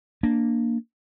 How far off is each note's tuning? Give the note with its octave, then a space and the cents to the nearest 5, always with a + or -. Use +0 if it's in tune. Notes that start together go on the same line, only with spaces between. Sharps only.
A#3 +0 D4 +0